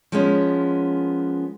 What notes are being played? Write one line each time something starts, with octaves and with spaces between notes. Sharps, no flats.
F3 G#3 A#3 B3 C#4